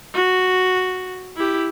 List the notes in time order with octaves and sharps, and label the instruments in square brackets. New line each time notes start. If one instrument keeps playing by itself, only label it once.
[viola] F#4
E4 G4